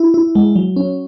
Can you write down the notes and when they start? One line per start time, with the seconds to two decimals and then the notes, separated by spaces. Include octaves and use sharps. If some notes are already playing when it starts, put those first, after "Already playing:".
Already playing: E4
0.14 E4
0.35 G#3
0.56 F#3
0.76 C#4